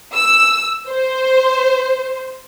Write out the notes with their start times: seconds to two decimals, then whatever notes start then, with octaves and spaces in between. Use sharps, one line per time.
0.15 E6
0.89 C5